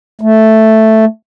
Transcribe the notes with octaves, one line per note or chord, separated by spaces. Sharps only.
A3